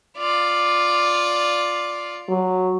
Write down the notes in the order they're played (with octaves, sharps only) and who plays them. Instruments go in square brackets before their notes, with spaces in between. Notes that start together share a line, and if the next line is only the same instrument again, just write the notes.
[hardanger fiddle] F4 D5
[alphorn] F#3